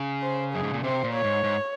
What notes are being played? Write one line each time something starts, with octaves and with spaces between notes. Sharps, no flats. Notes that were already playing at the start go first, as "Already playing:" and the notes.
Already playing: C#3
C5
F#2 G#4
G#2
A#2
C3 C5
A#2
C#5
G#2
G#2